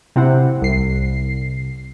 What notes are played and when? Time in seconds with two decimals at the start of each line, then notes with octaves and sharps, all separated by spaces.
0.16 C3 C4 E4 F#5
0.62 C2 C7